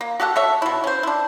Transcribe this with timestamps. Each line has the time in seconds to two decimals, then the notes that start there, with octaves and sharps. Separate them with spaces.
0.01 A#3
0.20 F#4 G4 A4 F#5
0.36 A4 C#5 E5
0.62 B2 E4
0.84 C#4 C5
1.03 D4 E4